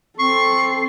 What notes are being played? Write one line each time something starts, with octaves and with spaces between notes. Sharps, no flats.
C4 A4 C#6 C7